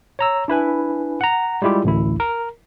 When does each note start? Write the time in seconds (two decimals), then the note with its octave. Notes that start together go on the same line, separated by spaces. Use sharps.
0.19 C#5 A#5 E6
0.48 D4 E4 B4 G#5
1.21 F#5 A#5
1.62 G3 G#3 E4 F4 G4
1.84 A1 D2 E4
2.20 A#4